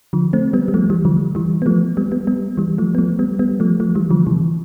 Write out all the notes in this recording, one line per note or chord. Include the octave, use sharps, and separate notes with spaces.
D3 F3
A3 C4
G3 B3
G3
F3 A3
E3 G3
D3 F3
E3 G3
B3
F3 A3
G3 B3
G3 B3
G3 B3
E3 G3
F3 A3
B3
F3 A3
G3 B3
G3 B3
F3 A3
F3 A3
E3 G3
D3 F3
C3 E3